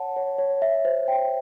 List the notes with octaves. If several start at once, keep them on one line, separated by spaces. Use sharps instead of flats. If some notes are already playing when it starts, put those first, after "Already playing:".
Already playing: C#5 F#5 A5
C#5
C#5
E5
C5
G5